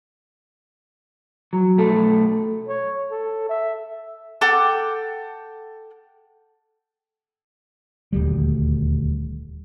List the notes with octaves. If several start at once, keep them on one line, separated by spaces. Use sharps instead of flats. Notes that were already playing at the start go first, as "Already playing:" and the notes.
F#3
B1 A3 A4
C#5
A4
E5
A4 F#5 G5 D6
D#1 D2 G3